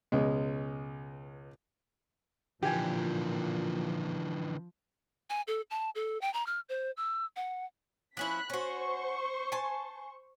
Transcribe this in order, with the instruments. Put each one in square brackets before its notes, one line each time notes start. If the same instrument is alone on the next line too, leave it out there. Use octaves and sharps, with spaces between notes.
[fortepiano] C#2 B2 G#3
[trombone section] A#2 [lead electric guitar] D3 E3 [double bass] F3 [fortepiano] G4 G#5
[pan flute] G#5
A4
A5
A4
G5
A#5
F6
C5
E6
F#5
[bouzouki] F3 C#4 E4 [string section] B5 F#6 B6
[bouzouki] C#4 F#4 [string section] C5 C#6
[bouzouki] G#5 A5